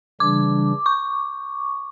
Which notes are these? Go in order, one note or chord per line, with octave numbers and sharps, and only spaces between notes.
C#3 E3 G3 D4 D6
C#6